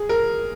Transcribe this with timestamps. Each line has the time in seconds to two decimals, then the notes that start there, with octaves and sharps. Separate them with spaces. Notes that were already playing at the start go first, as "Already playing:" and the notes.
Already playing: G#4
0.09 A#4